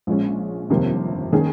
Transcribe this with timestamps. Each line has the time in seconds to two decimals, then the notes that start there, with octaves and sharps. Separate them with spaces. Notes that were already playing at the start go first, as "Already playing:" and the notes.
0.07 A#1 A#2 G#3 C#4
0.70 G1 F2 C3 D#3 A#3
1.32 D#3 A#3 C#4 G#4